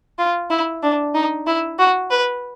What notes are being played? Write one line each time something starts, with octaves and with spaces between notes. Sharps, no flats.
F4
E4
D4
D#4
E4
F#4
B4